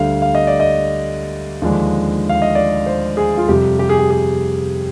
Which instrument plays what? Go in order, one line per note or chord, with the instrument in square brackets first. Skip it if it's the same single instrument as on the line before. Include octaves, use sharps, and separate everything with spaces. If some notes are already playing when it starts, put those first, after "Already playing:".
Already playing: [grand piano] D2 D3 G3 F5
F5
D#5
D5
D#5
D#2 D3 F3 G#3 D4
F5
D#5
D5
C5
G#4
F4
F2 C3 G3 G4
G4
G#4
G4
G#4